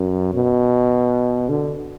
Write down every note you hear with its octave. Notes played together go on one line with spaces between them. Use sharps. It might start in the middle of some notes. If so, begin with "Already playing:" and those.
Already playing: F#2
B2
D3